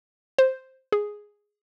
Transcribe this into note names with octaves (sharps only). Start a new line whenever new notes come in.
C5
G#4